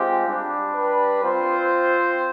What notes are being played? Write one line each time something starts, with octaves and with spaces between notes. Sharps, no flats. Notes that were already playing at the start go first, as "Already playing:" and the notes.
Already playing: G#3 C4 F4 G4
G3 D4 G4
B4
C4 F4 C5